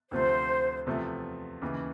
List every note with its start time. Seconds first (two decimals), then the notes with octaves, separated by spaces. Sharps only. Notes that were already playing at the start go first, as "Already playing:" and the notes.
0.11 D2 C3 F3 A3 C5
0.86 E2 C3 F3 A3
1.62 D#2 C#3 E3